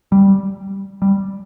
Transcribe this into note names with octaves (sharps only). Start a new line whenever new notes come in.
G3
G3